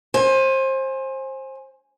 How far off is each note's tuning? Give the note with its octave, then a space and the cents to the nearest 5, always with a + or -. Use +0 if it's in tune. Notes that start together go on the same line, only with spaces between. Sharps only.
C5 +25 G#5 +0